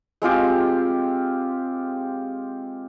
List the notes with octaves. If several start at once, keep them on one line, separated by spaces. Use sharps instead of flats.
G#3 C4 F4 G4